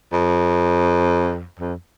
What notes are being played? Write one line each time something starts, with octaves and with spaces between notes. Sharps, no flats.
F2
F2